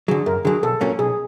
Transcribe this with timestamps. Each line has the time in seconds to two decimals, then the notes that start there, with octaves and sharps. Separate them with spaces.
0.08 F#3 G#4
0.11 D3
0.26 F#2 A#4
0.45 D3 F#3 G#4
0.63 B1 A4
0.81 A#2 F#3 A#3 C#4
0.99 B1 G#4